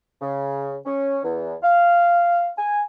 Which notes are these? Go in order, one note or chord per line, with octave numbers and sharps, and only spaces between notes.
C#3
C#4
E2
F5
G#5